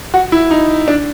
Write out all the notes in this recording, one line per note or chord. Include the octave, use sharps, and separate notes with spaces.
F#4
E4
D#4
D4